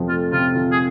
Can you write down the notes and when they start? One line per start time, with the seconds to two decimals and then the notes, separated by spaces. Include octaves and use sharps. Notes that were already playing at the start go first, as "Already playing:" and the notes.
Already playing: F2 C3 F3
0.08 A3 F4
0.32 C3 F4
0.56 F3
0.72 G#4